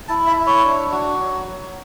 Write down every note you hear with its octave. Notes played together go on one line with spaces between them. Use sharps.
E4 A5
E5
E4
C#5
D4
F#4
F#3
F#3